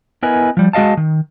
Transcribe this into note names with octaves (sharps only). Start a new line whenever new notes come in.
B3 E4 A#4 B4 D#5 G#5
F3 G3
G#3 F#4 D#5 F5 A5
D#3